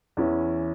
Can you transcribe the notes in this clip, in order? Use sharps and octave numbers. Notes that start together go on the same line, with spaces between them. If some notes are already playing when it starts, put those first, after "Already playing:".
E2 E3 C#4 E4